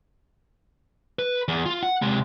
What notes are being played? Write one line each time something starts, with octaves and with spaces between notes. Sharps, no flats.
B4
E2
F4
F#5
C3 G#3